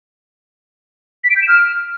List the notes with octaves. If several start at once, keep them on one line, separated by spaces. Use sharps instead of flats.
B6
D7
G6
E7
F6